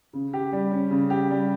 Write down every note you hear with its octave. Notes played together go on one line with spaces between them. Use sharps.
C#3
G4
G3
C#4
C#3
G4
G3